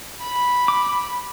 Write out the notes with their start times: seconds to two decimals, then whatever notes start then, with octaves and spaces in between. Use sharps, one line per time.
0.21 B5
0.68 D6